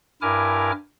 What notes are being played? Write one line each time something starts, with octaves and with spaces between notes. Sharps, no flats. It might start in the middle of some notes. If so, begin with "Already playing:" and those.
G2 E4 A#4 G#5 D6 F6